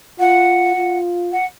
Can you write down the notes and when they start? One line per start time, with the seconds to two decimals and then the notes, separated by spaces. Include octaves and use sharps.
0.19 F4 F#5
0.76 F4
1.32 F#5